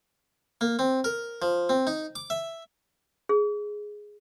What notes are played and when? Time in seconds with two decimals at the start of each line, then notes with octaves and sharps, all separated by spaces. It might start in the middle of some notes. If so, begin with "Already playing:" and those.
0.61 A#3
0.79 C4
1.04 A#4
1.42 F3
1.69 C4
1.87 D#4
2.16 D6
2.30 E5
3.29 G#4